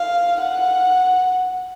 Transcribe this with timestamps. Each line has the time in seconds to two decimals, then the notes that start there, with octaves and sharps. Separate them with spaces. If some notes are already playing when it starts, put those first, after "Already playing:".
Already playing: F5
0.40 F#5